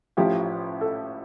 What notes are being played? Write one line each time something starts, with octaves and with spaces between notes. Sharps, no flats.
A1 A2 F3 G4
A4